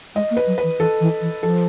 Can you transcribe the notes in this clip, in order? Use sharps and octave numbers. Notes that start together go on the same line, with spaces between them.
G#3 D#5
A#3
B4
F#3
B4
E3
E3 A4
E3
E3
F3 A4